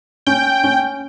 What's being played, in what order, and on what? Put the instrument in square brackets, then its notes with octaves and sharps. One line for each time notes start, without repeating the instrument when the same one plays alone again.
[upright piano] C#4 [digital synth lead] G5
[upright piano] C#4